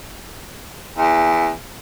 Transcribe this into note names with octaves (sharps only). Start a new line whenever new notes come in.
E2